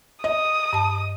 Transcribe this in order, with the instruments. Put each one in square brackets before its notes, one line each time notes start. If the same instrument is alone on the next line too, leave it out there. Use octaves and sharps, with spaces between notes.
[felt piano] D#5 [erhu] D#6
[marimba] G2 A5